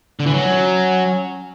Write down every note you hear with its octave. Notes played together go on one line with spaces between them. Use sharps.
D3
E3
F#3 C#4